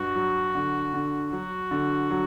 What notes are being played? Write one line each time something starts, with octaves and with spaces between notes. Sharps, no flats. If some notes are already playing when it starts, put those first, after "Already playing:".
Already playing: G2 F#4
F#3
D3
D3
F#3 F#4
D3
F#3